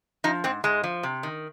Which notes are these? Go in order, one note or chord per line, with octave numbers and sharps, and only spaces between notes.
F3 D#4
G#2 C4
G#2 G#3
F3
C3
D#3